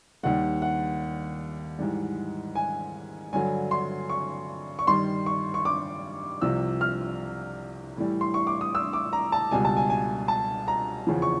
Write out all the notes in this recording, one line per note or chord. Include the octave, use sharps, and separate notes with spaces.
D#2 D#3 G3 F#5
F#5
G#2 E3 G3
G#5
G2 D3 F#3 G#5
C6
C#6
C#6
G2 D#3 G3 C6
C#6
C#6
D6
C2 C3 F3 E6
F6
A2 E3 G3
C6
C#6
D6
D#6
E6
D6
A#5
A5
C#2 B2 G3 G#5
A5
G#5
G#5
A5
A#5
E2 C#3 F3
C#6